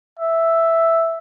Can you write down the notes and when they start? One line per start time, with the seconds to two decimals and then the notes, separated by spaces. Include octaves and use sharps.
0.20 E5